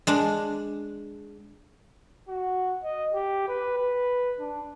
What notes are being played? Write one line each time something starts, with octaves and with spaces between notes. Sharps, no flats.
G#3 D4
F#4
D#5
G4
B4
B4
D4